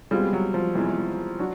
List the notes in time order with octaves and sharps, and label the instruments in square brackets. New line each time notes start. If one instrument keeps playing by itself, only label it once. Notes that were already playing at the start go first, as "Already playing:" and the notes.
[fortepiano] B2 G#3 C4 F4 G#4 [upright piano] G3
[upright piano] F#3
F3
[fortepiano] E2 C3 E3 G#3
[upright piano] F#3 [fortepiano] D4 F#4